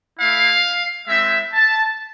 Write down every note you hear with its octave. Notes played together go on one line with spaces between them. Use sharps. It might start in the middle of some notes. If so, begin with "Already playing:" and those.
A3 E4 F5
G#3 C4 E4 E5
A5